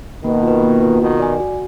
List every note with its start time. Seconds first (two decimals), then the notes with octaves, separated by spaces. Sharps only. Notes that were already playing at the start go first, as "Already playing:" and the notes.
0.24 B2 D#3 A#3
0.43 F4 B4
0.63 A#3
0.82 F4 B4
1.01 B2 D#3 F#4
1.20 D5 G#5
1.40 F#4